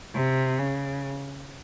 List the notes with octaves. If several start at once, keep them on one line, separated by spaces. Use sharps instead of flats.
C3
C#3